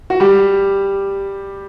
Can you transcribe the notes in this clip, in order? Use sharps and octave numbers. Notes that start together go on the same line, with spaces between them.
F#4
G3 G4